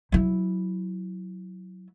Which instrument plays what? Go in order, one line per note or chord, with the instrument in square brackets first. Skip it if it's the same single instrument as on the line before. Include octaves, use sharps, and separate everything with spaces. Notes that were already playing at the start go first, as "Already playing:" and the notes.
[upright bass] F#3 E4